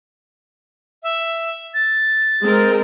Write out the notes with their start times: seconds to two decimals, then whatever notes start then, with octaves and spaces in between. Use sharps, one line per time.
1.03 E5
1.74 A6
2.44 G#3 C4 A#4